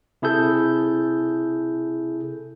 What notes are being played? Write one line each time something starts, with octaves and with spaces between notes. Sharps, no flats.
C3 E4 G#4 A4 G6